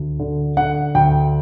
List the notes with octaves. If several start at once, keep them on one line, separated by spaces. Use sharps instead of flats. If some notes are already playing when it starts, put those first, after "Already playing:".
Already playing: D2
D3
D3 F#5
D2 G5